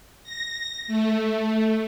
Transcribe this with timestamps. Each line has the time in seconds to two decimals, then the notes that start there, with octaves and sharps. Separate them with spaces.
0.23 A#6
0.88 A3